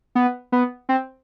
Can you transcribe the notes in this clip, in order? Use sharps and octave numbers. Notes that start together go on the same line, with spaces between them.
B3
B3
C4